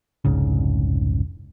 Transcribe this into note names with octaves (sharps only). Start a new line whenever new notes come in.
F1 C2 G#2 C#3